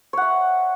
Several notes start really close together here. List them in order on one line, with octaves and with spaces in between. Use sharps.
C#5 F#5 E5